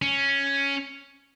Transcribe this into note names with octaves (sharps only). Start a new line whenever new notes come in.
C#4